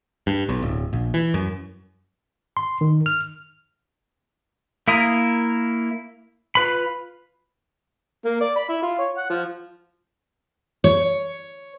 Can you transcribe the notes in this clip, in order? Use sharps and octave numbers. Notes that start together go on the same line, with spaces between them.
G2
B1
D1
A#1
E3
F#2
C6
D#3
F6
A#3 E4 A#5 D#6
F4 B4 B5
A#3
D5
B5
E4
F4
C#5
F#5
F3
C#5